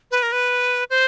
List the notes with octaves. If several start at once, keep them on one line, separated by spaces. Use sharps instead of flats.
B4
A#4
B4
C5